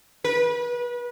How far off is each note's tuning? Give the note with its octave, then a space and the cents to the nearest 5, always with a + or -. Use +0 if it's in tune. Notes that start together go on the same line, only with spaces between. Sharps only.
B4 -30